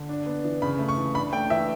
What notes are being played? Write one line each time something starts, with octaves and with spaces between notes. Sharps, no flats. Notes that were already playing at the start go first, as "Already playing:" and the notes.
Already playing: D3
D4
B3
E3
C#3 B5
A3
C#6
E3
D4 B5
A3 G5
E3 E5